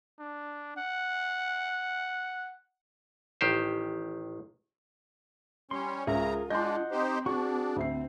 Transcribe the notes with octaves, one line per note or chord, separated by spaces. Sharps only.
D4
F#5
A1 D#3 G4 C5
G3 C#4 C#5 C6
C#2 C#3 F4 G#4 A#4 E5 A#5
G#3 D4 D#5 F#5 C6 G6
C4 D#4 G4 C5
D4 F#4 G#4 C#6
D2 C4 E5 C7